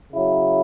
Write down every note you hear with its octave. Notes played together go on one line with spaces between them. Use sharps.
C#3 F#3 E4